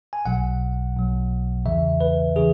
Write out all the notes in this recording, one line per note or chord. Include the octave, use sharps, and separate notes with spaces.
G#5
B1 B2 F#3 F#5
B1 B2 F#3
E2 C#3 E3 E5
B4
C#3 E3 G#4